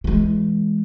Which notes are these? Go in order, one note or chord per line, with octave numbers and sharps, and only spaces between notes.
E3 G#3